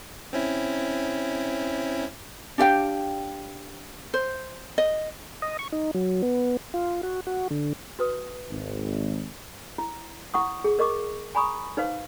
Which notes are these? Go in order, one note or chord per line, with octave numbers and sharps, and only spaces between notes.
C4 C#4 E4
D4 G4 F5 G5
C5
D#5
D#5
C#6
D#4
F#3
B3
F4
F#4
F#4
D3
F#4 B4 D#6
G#1
E4
E4 F#5 C#6 D#6
G#4
A#4 D#5 C#6 D6
G#5 A#5 B5 C#6 D#6
D#4 B4 C5 F5